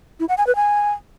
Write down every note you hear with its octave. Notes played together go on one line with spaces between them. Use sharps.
E4
F#5
G#5
B4
G#5